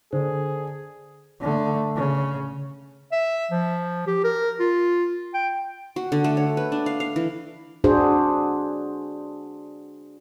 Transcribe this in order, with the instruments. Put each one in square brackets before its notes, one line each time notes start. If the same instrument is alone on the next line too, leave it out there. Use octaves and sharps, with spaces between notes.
[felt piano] D3 [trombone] G#4 [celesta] A4 C5
[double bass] D3 A3
C#3
[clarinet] E5
F3
G4
A#4
F4
G5
[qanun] F#4
D3
A3
C#5
B4
D4
F5
F5
E3
[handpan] D4 F#4 G#4 C5